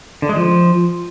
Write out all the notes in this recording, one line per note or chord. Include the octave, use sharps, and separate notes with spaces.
D3
G#3
F3